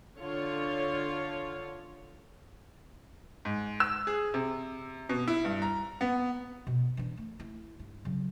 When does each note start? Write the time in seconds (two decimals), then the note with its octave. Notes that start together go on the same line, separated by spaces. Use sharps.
0.19 D3 F4 C#5
3.45 G#2
3.80 E6
4.07 G#4
4.34 C3
5.09 B2
5.28 E4
5.45 G2
5.62 A#5
6.01 B3
6.67 B2
6.97 E3 D4
7.17 A3
7.40 E4
7.79 G2
8.05 C#3 F#3